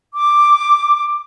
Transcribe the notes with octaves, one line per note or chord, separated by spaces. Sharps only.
D6